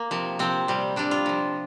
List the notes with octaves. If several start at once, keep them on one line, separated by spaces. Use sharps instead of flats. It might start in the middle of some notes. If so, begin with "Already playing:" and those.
Already playing: A#3
C3 F3
C3 F3 C4
C3 G3
C3 G3 D4
F4
C3 F3